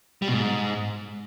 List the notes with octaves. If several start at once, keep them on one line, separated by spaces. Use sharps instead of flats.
G3
B2
G#2